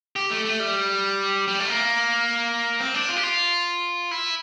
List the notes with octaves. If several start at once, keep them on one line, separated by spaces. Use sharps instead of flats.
G4
A3
A3
G3
G3
A3
A#3
C4
D4
F4
G4
F4
E4